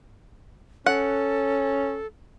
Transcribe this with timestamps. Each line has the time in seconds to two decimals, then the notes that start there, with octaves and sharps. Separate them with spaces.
0.86 C#4 A4 F#5